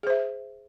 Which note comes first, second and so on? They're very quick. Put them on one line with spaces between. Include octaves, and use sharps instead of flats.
G#4 C5 E5